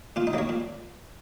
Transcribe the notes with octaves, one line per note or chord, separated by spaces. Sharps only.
A#2 F4
D#4
F#3 A#3 C#5
A#2